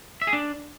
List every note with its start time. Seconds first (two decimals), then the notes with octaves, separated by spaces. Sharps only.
0.22 E5
0.27 G#4
0.33 D4